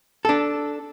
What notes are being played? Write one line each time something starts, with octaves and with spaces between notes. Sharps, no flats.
D4 A4